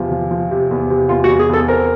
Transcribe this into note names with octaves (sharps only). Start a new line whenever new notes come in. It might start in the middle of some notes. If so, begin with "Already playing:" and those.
Already playing: E2 C3 F3
F3
F3
C3
E2
C3
E2 F4
F#4
E2
G#4
E2 A4
C4 A#4